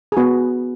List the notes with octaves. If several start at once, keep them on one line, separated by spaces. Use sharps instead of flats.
G#4
B3 F#4 B4